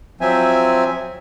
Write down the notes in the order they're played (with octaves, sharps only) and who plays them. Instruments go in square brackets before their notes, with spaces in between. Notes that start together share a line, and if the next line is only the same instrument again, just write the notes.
[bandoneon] F3 F#3 C4 E5 G#5